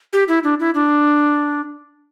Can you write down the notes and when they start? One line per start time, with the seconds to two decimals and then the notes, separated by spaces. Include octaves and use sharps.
0.13 G4
0.28 E4
0.44 D4
0.60 E4
0.75 D4